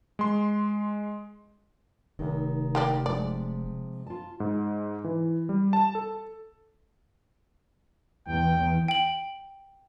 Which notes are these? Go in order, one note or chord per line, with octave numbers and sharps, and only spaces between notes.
G#3 C6
F1 D#3
A#3 G4 D5
C3 F3 G#3 D5
F4 A5
G#2
E3
G3
A5
A4
E2 G5
G5 F#7